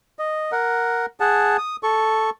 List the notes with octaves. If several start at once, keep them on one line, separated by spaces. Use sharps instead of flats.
D#5
A#4 F#5
G#4 F#5 A5
D#6
A4 C#6